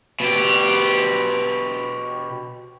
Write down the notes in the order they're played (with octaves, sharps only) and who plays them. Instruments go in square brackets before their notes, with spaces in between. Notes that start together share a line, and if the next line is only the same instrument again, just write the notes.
[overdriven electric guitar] B2 G4